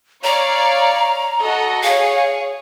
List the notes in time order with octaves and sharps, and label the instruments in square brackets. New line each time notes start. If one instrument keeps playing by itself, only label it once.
[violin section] C#5 D5 F5 [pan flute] A#5
[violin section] F#4 A4 D#5
[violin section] G#4 C#5 [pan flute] F5